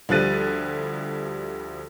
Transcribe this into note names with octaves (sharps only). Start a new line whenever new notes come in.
D2 F3 G3 F#6 A6 D#7